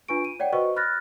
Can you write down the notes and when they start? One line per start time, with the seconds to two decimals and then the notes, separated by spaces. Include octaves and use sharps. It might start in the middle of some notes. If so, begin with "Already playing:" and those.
0.08 D4 F4 B4 G#5 C#6 D7
0.25 D#7
0.40 C#5 D5 F#5 G5
0.52 F#4 B4 C5 D#5 C#6
0.76 B5 F6 F#6 A6 A#6